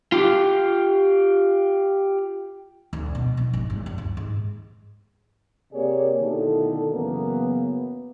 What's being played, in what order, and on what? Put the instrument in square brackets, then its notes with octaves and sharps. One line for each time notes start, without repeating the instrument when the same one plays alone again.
[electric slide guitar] F4 G4
[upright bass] D2
B2
F3
G#1
E1
G2
D2
G#2
[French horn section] C3 A#3 G4 G#4 C#5 D5
B2 D3 D#3 A3 E4 A4
F#2 C#3 E3 A#3 B3